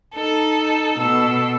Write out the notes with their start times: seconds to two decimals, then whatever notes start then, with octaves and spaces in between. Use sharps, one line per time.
0.15 D#4 A4
0.99 B2 A4 E6